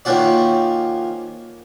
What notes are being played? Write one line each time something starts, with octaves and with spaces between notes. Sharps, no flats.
D#3 F3 A#3 C#4 F#4 D5